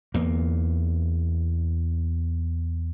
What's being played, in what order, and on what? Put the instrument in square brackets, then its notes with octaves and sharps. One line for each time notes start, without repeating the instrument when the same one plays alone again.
[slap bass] E2 A#3